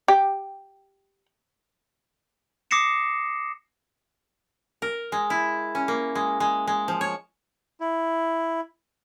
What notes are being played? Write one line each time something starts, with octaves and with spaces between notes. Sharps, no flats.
G4
D6 D#6 A#6 C7 C#7 E7
A#4
G#3
E4
C#4
A#3
G#3
G#3
G#3
F3
C#5
E4